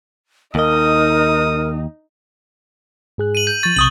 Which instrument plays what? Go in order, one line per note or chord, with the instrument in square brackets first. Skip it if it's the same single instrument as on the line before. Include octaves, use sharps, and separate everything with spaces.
[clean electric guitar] D#2 D#5 [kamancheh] D#4 [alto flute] A#4 [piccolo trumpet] D#6
[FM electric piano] G#2 G#4 F#6
[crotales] D#7 F#7
[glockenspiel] G6
[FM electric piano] F3 C#6 [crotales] A6
[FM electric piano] B1 C3 [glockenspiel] C#6 D#6 F#7